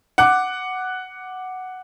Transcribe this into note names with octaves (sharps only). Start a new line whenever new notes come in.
F#5 D6 F#6